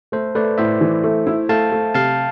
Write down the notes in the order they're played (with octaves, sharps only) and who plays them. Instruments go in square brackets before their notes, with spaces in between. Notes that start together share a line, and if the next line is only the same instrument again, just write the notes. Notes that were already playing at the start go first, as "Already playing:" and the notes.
[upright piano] A3 [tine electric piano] A4 C5
[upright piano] A3 [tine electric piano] B4 D5
[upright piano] A2 [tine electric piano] C5 E5
[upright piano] E3
A3
E4
[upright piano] A3 [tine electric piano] F5 A5
[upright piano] A3
[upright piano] C3 [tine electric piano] F5 A5